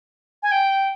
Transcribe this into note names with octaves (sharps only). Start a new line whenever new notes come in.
G#5
G5